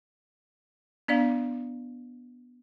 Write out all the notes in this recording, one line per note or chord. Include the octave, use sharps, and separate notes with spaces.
B3 D4 D5 F5